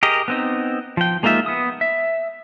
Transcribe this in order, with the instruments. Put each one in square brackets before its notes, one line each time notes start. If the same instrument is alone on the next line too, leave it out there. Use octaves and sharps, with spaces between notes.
[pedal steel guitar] G4 G#4 A#4 D#5
B3 C4 D#4
F3 G5
G#3 A#3 D#4 F4 E5
B3 D#6
E5